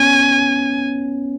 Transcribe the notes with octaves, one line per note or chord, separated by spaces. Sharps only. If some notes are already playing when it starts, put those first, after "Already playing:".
Already playing: B3 C#4 G#5